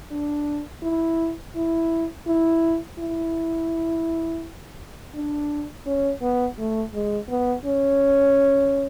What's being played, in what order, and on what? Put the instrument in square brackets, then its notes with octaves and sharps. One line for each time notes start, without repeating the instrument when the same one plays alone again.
[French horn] D4
E4
E4
E4
E4
D4
C#4
B3
A3
G#3
B3
C#4